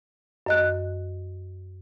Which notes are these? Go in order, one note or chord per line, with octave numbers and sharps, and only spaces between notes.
F#2 D#5 F#6